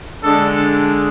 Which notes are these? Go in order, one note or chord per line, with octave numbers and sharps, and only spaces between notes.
D3 G#3 D4 A4